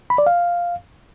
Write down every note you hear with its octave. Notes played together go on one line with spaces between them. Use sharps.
B5
D5
F5